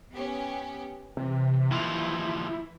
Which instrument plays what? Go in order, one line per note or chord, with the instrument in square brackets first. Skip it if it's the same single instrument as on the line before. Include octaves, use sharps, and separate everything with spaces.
[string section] B3 C#4 G4
[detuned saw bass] C3 [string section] E3
[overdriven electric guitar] D#2 F3 [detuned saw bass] E4